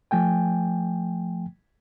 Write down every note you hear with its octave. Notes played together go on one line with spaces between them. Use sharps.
F3 A3 G5 G#5